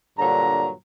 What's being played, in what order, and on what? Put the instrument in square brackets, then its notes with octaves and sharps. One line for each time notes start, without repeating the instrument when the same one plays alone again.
[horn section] G2 A#2 D3 F#3 A#5